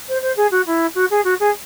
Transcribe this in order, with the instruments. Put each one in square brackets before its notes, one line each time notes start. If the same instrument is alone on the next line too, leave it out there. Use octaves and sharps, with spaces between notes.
[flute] C5
C5
G#4
F#4
E4
F#4
G#4
F#4
G#4